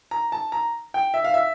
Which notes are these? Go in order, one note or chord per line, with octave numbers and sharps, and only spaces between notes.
A#5
A5
A#5
G5
E5
F5
E5